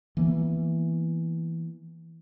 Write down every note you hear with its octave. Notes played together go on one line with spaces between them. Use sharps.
E3 A#3 B3